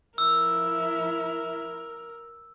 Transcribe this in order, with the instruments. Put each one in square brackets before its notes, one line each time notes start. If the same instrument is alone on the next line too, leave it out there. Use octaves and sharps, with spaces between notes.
[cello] F3 E4 [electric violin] A#4 [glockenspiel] E6